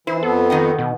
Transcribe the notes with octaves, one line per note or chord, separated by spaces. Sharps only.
E3 E4 C5
F2 B3 A4
D#3 D#4 F#5
B2